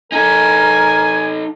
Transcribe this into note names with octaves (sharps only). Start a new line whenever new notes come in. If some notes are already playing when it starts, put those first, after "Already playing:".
D#4 A4 A#4 G#5